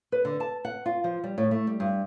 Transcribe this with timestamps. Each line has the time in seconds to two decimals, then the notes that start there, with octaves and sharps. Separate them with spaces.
0.12 B4
0.25 D3
0.40 A5
0.65 F#5
0.86 F4
1.04 F3
1.24 G3
1.38 A2
1.51 A3
1.67 G3
1.80 G2